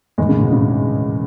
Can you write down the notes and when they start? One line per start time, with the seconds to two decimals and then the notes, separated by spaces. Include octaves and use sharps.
0.18 E2 A2 D#3 G#3
0.29 A2 C#3
0.41 G#2 B2
0.52 A2 C#3